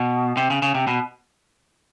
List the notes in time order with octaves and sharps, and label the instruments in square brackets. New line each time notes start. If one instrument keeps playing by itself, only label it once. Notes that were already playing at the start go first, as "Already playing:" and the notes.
Already playing: [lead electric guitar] B2
C3
C#3
C#3
C3
B2